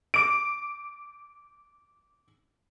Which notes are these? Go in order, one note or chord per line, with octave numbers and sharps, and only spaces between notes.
D6 D7